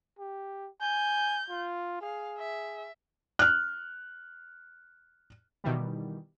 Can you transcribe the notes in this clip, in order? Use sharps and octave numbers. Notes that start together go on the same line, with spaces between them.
G4
G#5 G6
F4
G#4 F5
E5
F6 F#6
B2 D#3 E3 G3